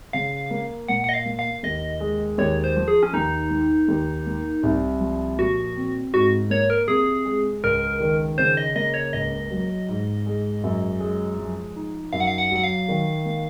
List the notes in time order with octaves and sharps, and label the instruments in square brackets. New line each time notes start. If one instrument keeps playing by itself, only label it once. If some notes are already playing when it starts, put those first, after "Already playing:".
[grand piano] C#3 [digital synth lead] F5
[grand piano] A#3
[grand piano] A#2 [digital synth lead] F#5
[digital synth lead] F#5
D#5
F5
[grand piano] A#3
[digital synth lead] F5
[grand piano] D#2 [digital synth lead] D#5
[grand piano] G#3
[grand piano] D#2 [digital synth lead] C#5
[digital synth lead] C5
[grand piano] F3
[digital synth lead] G#4
C#4
[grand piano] D#2 [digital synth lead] D#4
[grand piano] A#3
D#2
A#3
C2
F3
[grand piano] A#2 [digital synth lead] F#4
[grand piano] C4
[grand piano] G#2 [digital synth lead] F#4
[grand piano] A#3 [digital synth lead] C#5
[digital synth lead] A#4
[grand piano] C3 [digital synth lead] G#4
[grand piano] G#3
[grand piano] C#2 [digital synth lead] A#4
[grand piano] D#3
[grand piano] C#3 [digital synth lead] C5
[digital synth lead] D#5
[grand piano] A#3 [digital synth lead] D#5
[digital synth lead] C#5
[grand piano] C#2 [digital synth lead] D#5
[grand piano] F#3
G#2
G#3
F#2
G#3
F3
D#4
[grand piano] F#2 [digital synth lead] F5
[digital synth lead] F#5
F5
F#5
[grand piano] F#3 [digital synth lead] F#5
[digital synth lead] F5
[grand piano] D#3
A#3